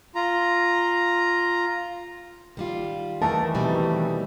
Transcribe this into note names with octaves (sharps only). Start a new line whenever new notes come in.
F4 A#5
D#3 G3 F4
D#3 E3 A3 A#4 A5
B2 G3 C4